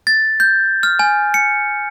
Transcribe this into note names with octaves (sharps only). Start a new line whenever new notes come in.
A6
G6
F6
G#5
C#7